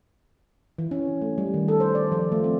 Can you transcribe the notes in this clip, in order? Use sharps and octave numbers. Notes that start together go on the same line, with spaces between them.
E3
C#4
A3
G3
D#3
A4
C5
D5
F3
A3
C4